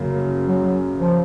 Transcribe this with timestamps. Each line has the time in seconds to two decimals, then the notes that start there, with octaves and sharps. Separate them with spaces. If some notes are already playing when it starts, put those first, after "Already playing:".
Already playing: F#2 C#3 F#3 A#3
0.46 F#3
0.99 F3